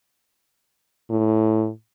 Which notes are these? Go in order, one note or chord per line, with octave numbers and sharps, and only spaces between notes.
A2